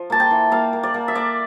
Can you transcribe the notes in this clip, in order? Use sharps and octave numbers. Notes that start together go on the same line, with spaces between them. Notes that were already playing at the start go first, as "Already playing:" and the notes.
Already playing: F3
A#3 A5
G5
E3
A#3 F5
A#3
D5
A#3
E5
A#3 D5